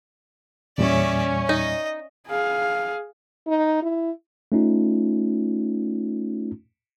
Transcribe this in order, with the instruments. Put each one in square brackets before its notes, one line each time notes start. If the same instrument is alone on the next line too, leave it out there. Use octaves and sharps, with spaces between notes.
[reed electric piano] E2 A#2 G3 [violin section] C#4 [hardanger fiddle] D5 E5
[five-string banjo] D#4 [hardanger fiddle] D#5
[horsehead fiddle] G#4 F5
[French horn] D#4
E4
[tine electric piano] A3 C#4 D#4 F4